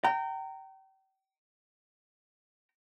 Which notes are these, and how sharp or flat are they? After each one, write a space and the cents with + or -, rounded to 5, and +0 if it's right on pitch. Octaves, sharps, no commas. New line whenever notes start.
G5 -30 A#5 -25